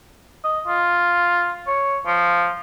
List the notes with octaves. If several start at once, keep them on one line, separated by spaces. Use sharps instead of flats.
D#5
F4
C#5
F3